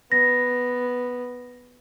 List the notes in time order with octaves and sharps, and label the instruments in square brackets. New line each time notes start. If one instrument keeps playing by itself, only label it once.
[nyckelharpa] B3 [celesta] A#6